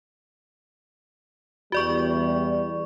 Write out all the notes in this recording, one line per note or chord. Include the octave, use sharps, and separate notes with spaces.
E2 G3 F#4 D5 C#6